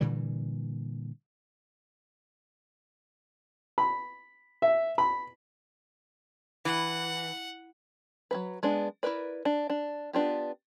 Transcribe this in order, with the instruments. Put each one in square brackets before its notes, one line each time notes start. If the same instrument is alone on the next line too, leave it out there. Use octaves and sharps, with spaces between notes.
[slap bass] A#2 D3 E3 G3
[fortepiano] B5
E5
B5
[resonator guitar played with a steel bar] E3 [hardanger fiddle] F#5
[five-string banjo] F#3 A3 B4
G#3 B3 D4
E4 G#4 A#4 B4 D5
D4
D4
B3 D4 F4 G4